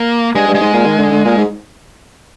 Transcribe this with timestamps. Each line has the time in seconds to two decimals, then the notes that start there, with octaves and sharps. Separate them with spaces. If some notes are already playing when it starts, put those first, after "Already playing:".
Already playing: A#3
0.35 G2 G#3
0.48 G2
0.55 G#3
0.61 G#2
0.74 A#2
0.86 D#3
0.98 D3
1.11 D3
1.25 A#2
1.37 G#2